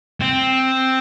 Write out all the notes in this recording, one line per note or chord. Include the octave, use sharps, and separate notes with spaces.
C4